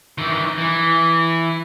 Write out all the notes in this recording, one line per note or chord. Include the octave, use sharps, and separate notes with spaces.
D#3 E3
E3